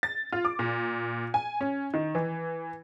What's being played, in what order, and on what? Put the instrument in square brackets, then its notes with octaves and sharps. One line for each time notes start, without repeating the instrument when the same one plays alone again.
[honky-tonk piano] A6
F4
D6
A#2
G#5
C#4
D#3
E3